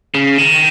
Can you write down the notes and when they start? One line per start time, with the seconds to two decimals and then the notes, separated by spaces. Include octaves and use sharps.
0.15 C#3
0.38 D#3